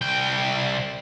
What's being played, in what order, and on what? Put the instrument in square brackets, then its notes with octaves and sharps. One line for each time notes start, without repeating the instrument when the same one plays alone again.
[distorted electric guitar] C2 G5